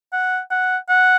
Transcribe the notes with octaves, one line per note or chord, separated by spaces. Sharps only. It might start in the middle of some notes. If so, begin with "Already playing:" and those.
F#5
F#5
F#5